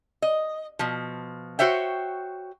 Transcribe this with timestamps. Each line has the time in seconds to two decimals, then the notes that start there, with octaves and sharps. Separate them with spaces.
0.22 D#5
0.79 B2 F3
1.59 F#4 C5 C#5 E5 G5